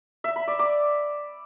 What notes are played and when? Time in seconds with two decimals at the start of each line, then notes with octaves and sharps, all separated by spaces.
0.24 E5
0.36 B5
0.48 D5
0.59 D6